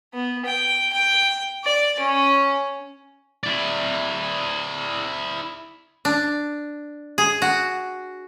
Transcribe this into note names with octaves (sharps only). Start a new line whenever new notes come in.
B3
G5
G5
D5
C#4
E4 D5
D4
G#4
F#4